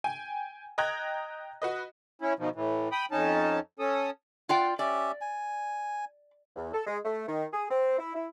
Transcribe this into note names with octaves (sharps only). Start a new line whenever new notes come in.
G5 G#5
D#5 G5 A#5 F#6 G#6 A#6
F#4 B4 D#5
C#4 E4
B2 D#3 F3
A2 E3
G5 B5 D#6
F2 C#4 D#4 A5
C#4 A4 D#6
F4 D5 F#5 G5
C#4 G4 D5 E5
G#5
E2
A4
G#3
A3
D#3
G#4
C4
E4
E4